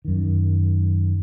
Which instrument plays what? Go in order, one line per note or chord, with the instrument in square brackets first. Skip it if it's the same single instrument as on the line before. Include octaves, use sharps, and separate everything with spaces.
[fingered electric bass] F#2 D#3